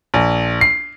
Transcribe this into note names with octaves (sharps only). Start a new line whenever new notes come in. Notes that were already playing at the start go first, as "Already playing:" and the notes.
A#1
C7